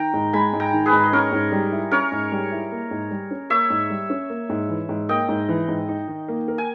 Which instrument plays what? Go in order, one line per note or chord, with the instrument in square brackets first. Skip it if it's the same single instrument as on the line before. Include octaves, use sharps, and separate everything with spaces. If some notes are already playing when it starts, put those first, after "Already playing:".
Already playing: [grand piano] D#3 [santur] G5 A#5
[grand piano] G#2
[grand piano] G#3 [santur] G#5 B5
[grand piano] G#2
[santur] G5 A#5
[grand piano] D#3
[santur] G#4 B4
[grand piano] G#2
[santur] D#5
[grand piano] C#4 [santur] A#4 C#5
[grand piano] G#2
G3
E4
[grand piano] C#4 [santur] A#4 C#5
[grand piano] G#2
G3
E4
A#3
G#2
G3
C#4
[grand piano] A#3 [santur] C#5 E5
[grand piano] G#2
G3
C#4
A#3
G#2
E3
G#2
[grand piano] A#3 [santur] D#5 G5
[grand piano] G#2
E3
G#2
D#4
D#3
A#3
A#4
[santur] G#5